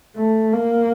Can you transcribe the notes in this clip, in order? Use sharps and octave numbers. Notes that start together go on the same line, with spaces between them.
A3
A#3